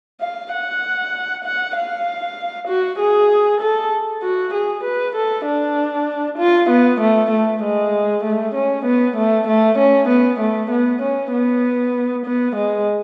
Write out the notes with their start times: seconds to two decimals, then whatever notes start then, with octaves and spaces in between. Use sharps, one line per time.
0.21 F5
0.53 F#5
1.44 F#5
1.76 F5
2.68 F#4
2.99 G#4
3.60 A4
4.22 F#4
4.54 G#4
4.84 B4
5.15 A4
5.46 D4
6.38 F4
6.69 B3
7.00 A3
7.31 A3
7.62 G#3
8.24 A3
8.55 C#4
8.85 B3
9.16 A3
9.47 A3
9.78 C#4
10.08 B3
10.39 A3
10.71 B3
11.02 C#4
11.32 B3
12.26 B3
12.56 G#3